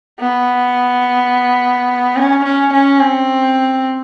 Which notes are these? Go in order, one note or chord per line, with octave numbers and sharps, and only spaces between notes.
B3
C#4
C#4
C#4
C4